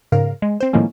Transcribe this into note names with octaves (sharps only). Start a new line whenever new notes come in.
G#2 C#3 A#4 F5
G#3
C4 C5
A2 D#3 F3 G#3 A#3 C#4